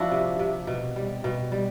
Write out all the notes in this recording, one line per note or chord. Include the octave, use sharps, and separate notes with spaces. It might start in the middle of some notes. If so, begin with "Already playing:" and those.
Already playing: F3 D4 E4 F#4
C3
C3
B2
G3
B2
G3